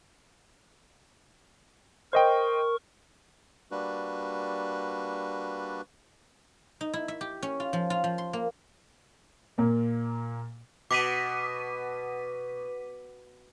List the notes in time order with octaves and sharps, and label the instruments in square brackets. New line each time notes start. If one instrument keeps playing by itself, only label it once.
[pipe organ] A#4 C#6 [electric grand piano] C5 D#5 G5
[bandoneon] G3 A#3 D4 F#4 B4
[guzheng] D#4
E4
E5
G4
C#4
F4
F3
F4
F3
C6
A#3
[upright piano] A#2 A#3
[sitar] B2 [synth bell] D6 B6 D#7